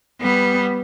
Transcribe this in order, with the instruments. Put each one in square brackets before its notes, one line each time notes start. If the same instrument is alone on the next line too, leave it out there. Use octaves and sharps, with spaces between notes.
[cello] G3 B3